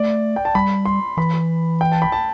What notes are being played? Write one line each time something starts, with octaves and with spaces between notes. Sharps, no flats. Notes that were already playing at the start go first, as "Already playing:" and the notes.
Already playing: A3 D5
G5
A5
G3 B5
C6
E3 B5
G5
A5
B5
A5